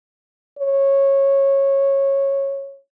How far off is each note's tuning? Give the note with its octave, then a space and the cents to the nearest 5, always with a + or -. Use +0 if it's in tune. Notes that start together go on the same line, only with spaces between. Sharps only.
C#5 -15